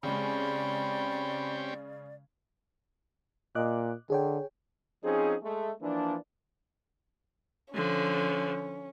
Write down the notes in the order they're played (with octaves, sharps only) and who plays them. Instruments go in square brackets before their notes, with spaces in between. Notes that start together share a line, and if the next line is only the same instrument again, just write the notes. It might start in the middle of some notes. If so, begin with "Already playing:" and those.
[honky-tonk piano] C#3 G#3 [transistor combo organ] C4 C#4 G4 [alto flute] D5 [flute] B5
[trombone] A#2 [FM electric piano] D#5 D6 F#6
[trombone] D3 [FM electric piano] G#4 C#5 G5
[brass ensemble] F3 C4 C#4 D#4 G#4
G#3 A3
E3 F3 A#3 D4
[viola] D3 F3 [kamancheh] C#4